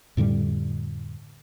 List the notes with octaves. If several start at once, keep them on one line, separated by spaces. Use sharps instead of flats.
F2 A2 D3 G3